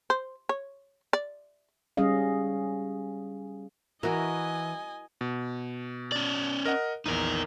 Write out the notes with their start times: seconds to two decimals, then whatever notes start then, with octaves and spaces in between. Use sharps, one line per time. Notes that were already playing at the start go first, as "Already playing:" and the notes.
0.10 C5
0.49 C#5
1.13 D5
1.97 G3 C#4 G#4 D#5 F5
4.03 E3 F#4 A#4 D#5 G#5
5.21 B2
6.12 C#4 D5
6.65 A#4 D#5 F#5
7.06 A#1 E2 D#4 A#4